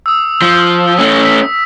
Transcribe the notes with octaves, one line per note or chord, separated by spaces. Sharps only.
D#6 E6
F3
A3 C#4
E6 B6